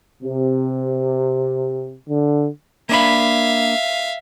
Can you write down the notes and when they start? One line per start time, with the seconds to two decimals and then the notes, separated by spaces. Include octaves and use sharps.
0.22 C3
2.08 D3
2.89 A#3 D4 E5 F5 B5